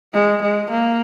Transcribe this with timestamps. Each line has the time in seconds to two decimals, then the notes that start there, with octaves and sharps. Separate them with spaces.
0.14 G#3
0.42 G#3
0.70 A#3